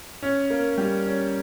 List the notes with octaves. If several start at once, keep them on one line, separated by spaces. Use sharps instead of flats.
C#4
A#3
G3
C#4